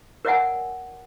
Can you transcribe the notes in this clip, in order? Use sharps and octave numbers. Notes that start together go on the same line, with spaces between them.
A#4 C#5 D5 E5 F#5 G#5